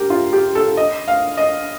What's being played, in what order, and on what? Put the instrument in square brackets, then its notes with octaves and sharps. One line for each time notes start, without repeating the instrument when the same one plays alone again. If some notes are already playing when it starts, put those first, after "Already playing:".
Already playing: [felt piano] G4 A#4
F4
G4
A4
D#5
F5
D#5